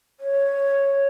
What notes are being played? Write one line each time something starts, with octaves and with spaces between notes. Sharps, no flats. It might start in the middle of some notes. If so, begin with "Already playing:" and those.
C#5